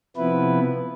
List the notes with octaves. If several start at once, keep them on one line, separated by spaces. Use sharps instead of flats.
C3 F3 B3 E4 B4